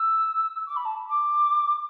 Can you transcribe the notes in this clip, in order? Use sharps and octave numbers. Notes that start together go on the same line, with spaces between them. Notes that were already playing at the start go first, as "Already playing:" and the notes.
Already playing: E6
D6
B5
A5
D6